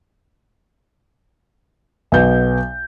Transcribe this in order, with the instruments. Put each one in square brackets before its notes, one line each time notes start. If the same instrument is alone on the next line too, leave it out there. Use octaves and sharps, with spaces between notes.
[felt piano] B1 B3 G6